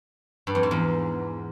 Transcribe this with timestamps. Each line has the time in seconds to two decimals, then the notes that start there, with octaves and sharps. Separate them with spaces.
0.47 G2
0.55 F2
0.63 G#2
0.71 E2